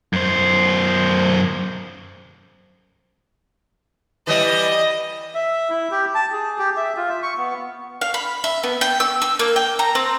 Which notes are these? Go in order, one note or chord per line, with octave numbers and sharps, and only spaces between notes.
F#2 C5
E3 G3 D#5
E5
E4
G4
A5
G#4
G4
E5
F4
E5
C#6
B3
F5
B5
E5
B3
G5
E6
E6
A#3
G5
A#5
C4